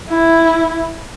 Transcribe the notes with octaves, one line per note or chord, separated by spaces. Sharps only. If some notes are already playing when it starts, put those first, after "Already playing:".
E4